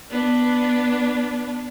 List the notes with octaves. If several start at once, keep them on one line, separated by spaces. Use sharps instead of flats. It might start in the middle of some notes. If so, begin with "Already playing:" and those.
B3 D4